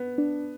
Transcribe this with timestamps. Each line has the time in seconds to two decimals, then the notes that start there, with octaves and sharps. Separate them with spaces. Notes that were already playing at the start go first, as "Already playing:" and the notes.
Already playing: B3
0.18 D4